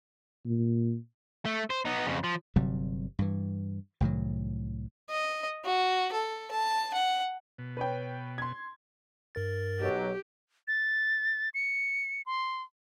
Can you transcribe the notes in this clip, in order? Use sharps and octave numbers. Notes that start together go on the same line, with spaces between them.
A#2
A3
C5
B3 D#4
F2 C#3
F3
G1 C3 F#3 G3
G2 E3
C2 A2 D#3 F#3
D#5
F#4
A4
A5
F#5
B2
B4 C#5 G5
C6 G#6
G2 A#4 A6
B1 F#3 G4
A6
C#7
C6